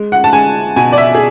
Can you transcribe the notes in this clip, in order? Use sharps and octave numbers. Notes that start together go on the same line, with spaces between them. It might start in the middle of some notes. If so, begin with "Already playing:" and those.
Already playing: G#3
F#5
A5
G#3 G#5
B2 G#5
D5
E5
G#4